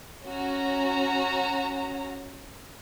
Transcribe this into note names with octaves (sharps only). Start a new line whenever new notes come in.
C#4 F#4 A#5